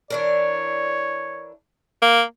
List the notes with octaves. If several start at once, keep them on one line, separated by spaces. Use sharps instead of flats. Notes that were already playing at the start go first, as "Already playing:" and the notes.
E3 D4 A#4 C#5
A#3